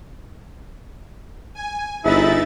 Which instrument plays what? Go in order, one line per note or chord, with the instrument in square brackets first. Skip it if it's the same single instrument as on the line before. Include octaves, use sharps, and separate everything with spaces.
[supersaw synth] G#5
[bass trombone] G1 [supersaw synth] D#4 E5 A6 [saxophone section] E4 [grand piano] G#4 B4 D#5